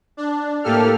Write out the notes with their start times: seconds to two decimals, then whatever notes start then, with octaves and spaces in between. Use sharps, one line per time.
0.17 D4
0.63 A2 A#3 G4 A4 F6